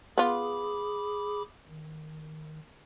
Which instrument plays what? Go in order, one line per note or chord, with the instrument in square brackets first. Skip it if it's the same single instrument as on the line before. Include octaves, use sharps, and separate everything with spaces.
[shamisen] B3 F4 [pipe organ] G#4 B5 D6
[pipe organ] D#3